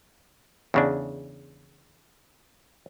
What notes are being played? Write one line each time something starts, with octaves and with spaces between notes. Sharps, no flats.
E2 C#3 D4